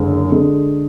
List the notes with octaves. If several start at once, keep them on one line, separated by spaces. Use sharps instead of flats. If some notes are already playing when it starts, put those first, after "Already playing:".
Already playing: F#1 F#2 D3 G#3
D3 G#3